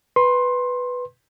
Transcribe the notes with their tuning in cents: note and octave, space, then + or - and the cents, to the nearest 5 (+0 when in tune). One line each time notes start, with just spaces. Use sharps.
B4 +0 C6 +20